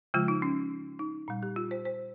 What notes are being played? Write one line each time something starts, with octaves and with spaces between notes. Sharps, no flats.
C#3 F3 G#3 F4
D#4
C#4
D#4
A#2 G3
G4
F4
C5
C5